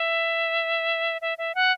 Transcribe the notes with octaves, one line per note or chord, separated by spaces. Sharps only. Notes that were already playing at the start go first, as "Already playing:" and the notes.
Already playing: E5
E5
E5
F#5